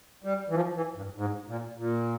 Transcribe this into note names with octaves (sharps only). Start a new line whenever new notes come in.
G3
E3
F3
E3
G2
G#2
A#2
A#2